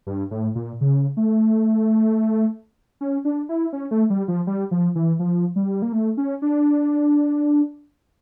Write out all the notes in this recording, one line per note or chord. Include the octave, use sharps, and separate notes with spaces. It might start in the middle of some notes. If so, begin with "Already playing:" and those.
G2
A2
A#2
C#3
A3
C#4
D4
E4
C#4
A3
G3
F3
G3
F3
E3
F3
G3
A#3
A3
C#4
D4